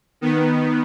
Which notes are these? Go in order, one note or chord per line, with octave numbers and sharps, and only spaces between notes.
D#3 B3